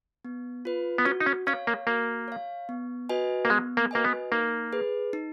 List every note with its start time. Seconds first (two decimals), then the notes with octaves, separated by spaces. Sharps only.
0.25 B3
0.65 F4 B4
0.98 B3
1.05 C#4 F#4
1.20 D#4
1.26 C#4
1.47 C#4 C#5 F5
1.67 A#3
1.87 A#3 F#4
2.28 C#5 F5
2.69 B3
3.09 F#4 B4 D#5 G#5
3.45 A#3
3.50 G#3 B3
3.77 A#3
3.91 A#3 F#4 B4 D#5 G#5
4.04 B3
4.32 A#3 D#4
4.73 G#4 B4
5.13 D#4